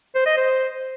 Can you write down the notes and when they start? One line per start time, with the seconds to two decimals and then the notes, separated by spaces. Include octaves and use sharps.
0.15 C5
0.26 D#5
0.37 C5